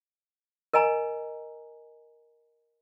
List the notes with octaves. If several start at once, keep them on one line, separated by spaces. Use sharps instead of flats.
A#4 D#5 G#5 A#5